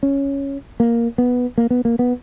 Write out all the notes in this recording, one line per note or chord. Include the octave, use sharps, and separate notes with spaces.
C#4
A#3
B3
A#3
B3
A#3
B3